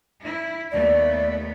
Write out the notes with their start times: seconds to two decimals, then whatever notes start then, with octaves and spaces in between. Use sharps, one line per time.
0.23 E4
0.72 D#2 A3 B3 D5